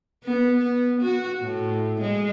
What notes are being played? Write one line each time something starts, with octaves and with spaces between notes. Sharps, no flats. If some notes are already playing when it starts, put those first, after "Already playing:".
B3
B3
F#4
A2
G#3